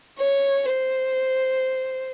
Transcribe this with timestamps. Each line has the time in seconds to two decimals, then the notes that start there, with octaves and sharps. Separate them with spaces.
0.19 C#5
0.71 C5